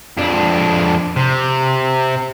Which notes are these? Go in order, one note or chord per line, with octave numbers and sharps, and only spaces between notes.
F2 D4
C3